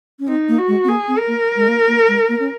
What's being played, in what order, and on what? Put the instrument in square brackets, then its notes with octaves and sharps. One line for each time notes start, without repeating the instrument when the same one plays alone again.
[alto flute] C#4
[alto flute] C4 [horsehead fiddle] D#4
[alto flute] A#3
[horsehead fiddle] F#4
[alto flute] G#3
C4
[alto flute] A#3 [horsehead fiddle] G#4
[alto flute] C4
[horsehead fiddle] A#4
[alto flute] A#3
G#3
A#3
A#3
G#3
A#3
C#4